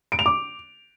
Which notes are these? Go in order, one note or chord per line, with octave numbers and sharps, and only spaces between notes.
D7
F7
D6